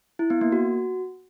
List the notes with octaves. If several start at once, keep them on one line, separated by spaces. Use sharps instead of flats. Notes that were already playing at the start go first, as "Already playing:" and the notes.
E4
B3
A#3
F#4